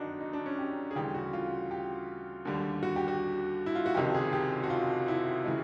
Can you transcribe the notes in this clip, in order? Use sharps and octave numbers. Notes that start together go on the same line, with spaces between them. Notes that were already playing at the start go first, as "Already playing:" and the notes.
Already playing: G1 F#2 D#3 D4 D#4 F#4
D#4
D4
C#4
G4
G#4
D2 C#3 E3 G3 G4
F#4
F4
G4
D#2 D3 G3
F#4
G4
F#4
E4
F4
F#4
F#1 F2 C3 D#3 G4
G#4
G4
F#4
F4
E4
C#3 E3 G#3